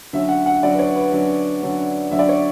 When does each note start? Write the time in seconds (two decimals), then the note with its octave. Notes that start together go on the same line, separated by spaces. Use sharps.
0.13 D3 F#3 C#4 E5
0.29 F#5
0.46 F#5
0.63 D3 F#3 C#4 D5
0.74 B4
0.79 C#5
0.96 B4
1.12 D3 F#3 C#4
1.62 D3 F#3 C#4
2.11 D3 F#3 C#4 E5
2.19 D5
2.29 C#5